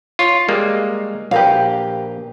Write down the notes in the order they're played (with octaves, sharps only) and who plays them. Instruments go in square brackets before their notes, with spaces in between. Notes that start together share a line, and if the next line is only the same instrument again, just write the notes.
[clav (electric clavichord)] F4 C#5
G3 G#3 A#3
[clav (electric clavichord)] A#1 B4 [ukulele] G4 A#4 F5